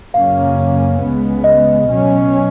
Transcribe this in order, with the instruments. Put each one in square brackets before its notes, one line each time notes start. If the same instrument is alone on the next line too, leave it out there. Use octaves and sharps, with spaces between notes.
[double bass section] F#2 C#3 F#3 A#3 C#4 [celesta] F5
[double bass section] C#2 C#3 G#3 B3
[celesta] D#5
[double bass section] B2 F#3 C#4